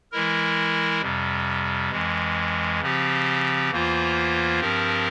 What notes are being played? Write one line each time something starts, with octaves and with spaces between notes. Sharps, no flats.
E3 G#3 E4 A#4
F2 C3 G3
F2 E3 G#3
C#3 F3 C4 G4
E2 E3 A#3 F4 C5
G2 F3 C4 G4 A#4